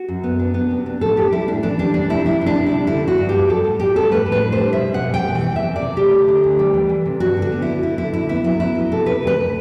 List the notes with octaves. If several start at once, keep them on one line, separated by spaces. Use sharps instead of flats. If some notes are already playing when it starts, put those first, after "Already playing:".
Already playing: F#4
F#2
B3
D4
B3
C3
D4
A2 A4
D4 G4
G3 E4
A2 D4
E3 D4
G3 D4
E3 D4
C3 E4
D4 E4
C3
D4
C3
G3 E4
D3 E4
G2 F#4
G2
G4
G3
G3 A4
A2
A2 G4
G3 A4
A2 B4
A2
B4
D4
C5
G3
B2 E5
B2
F#5
G3
G5
B2
E3 G5
E3
E5
C3
D5
C3
A3 G4
D2
D3
D2
G3
E3
E3
C3
G2 F#4
D3
F#4
B3
D3 E4
D3 E4
D3 E4
D3 E4
B3 E4
F#3 E4
B3 E4
F#3
C3 A4
C3 B4
D2 B4